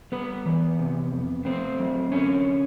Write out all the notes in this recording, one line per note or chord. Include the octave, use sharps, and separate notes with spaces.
G3 B3 B4
E3
C3
F2
A3 C4 C5
F#3
D3 C#4 C#5